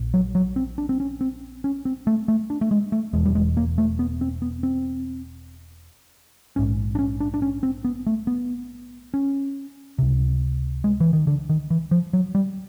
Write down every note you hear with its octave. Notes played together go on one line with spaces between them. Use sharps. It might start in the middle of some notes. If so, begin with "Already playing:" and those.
Already playing: A#1 A#2
F#3
F#3
C4
D4
C4
C#4
C4
C#4
C4
A3
A3
D4
A3
G#3
A3
E1 E2 B2 G#3
G3
G#3
A#3
A3
B3
C4
B3
C4
A#1 G#2 C#4
D4
C#4
D4
D4
C#4
C4
B3
A3
B3
C#4
C#2 C3
G#3
E3
D#3
D3
D#3
E3
F3
F#3
G3